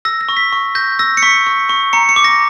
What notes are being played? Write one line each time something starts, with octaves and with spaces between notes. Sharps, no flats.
E6 A#6
A#6
C#6
B6
C#6
G6 A#6
E6 A#6
C#7
C#6 B6
C#6
C#6
A#5 C#7
C#7
D6
A#6